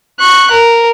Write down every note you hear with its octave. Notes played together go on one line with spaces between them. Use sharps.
C#6 F#6
A#4